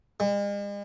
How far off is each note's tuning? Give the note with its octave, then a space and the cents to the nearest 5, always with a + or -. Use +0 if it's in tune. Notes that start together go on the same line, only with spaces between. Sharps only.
G#3 -45